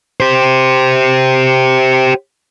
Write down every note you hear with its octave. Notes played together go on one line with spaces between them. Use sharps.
G4 C5